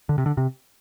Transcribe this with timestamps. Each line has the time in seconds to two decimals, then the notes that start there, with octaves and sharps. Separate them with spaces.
0.09 D3
0.18 C3
0.26 D3
0.37 C3